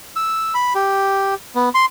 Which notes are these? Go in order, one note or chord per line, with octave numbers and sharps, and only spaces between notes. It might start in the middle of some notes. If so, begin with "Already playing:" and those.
E6
B5
G4
B3
C6